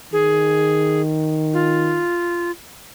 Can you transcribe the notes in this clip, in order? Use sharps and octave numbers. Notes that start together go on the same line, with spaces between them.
D#3 G#4
F4